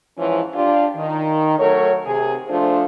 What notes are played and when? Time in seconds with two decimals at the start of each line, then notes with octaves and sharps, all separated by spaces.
0.18 G#2 E3 F3 C#4
0.54 D4 F4 G4
0.96 D#3
1.59 F#3 A3 A#4 C#5
2.06 C3 G#4
2.49 F3 A3 D4 F4 C5